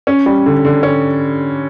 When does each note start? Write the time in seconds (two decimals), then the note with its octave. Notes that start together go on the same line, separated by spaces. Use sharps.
0.07 C#4
0.26 G3
0.46 D3
0.65 D3
0.83 C#4